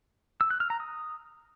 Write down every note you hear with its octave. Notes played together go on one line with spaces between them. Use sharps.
E6
F#6
F6
A#5
D#6